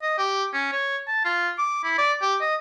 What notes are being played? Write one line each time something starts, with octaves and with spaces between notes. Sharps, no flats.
D#5
G4
C#4
C#5
A5
F4
D6
E4
D5
G4
D#5